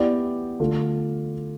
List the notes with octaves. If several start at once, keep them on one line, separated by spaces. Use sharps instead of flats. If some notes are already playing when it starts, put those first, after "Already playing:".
Already playing: B3 E4 G4 D5
D3 A3 D4 F4 A4